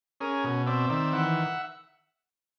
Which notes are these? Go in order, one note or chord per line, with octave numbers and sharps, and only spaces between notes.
C#4 G#4 A#4
B2
C4 D5 E5
D#3 D5 E5
E3 E5 F#5